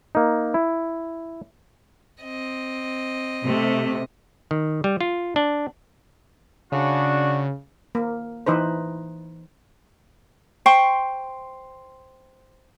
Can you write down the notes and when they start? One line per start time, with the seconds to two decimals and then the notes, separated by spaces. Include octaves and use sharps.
0.15 A#3 D#4
0.54 E4
2.23 C4 D#5
3.44 C3 A3
4.51 D#3
4.84 G3
5.01 F4
5.36 D4
6.72 C#3 D4 F#4
7.95 A#3
8.46 E3 D#4 B4 C5
10.66 C5 G5 C6 C#6